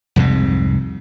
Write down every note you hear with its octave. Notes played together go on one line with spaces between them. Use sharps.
C2 F2 G#2 C3